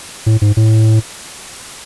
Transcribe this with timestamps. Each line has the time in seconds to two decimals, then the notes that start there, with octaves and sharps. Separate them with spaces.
0.26 A2
0.42 G#2
0.57 A2